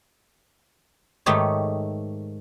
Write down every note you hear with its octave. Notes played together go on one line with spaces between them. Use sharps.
G#2 D#3 A3 D#4 G4 C#5